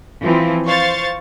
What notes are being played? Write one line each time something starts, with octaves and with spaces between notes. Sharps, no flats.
E3 F3 C4
C5 F5 C#6 A6